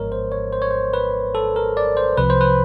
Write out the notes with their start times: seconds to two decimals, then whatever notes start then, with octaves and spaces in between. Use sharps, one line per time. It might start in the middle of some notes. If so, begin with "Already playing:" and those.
Already playing: G#1 G#2 F3 G#3 B3 A#4 C#5 D#5
0.12 C5
0.32 C#5
0.53 C5
0.62 C#5
0.71 C5
0.93 B4
1.35 A4
1.56 A#4
1.77 D5
1.97 C5
2.17 C2 C3 F3 B4
2.30 C5
2.41 B4